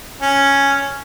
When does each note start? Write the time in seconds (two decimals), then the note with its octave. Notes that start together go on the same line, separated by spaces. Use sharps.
0.21 C#4